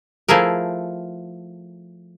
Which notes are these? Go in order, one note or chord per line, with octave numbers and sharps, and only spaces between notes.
F3 A3 E4 G#4 A#4